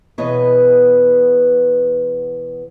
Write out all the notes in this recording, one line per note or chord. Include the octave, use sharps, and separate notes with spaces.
E2 B2 B3 B4 C#5 D#5